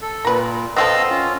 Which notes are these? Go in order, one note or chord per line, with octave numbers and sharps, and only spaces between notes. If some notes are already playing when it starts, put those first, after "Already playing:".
A4
A#2 A#4 B4
B3 C4 A4 D#5 F5 E6
C#4 F4